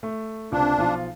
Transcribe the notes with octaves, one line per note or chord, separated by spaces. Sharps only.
A3
C#2 C3 D4
B1 F3 F4